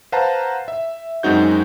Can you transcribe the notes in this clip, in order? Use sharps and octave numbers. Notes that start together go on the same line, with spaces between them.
B4 C5 F5 F#5 A5 A#5
E5
F#2 G#3 C4 D#4 F#4 G6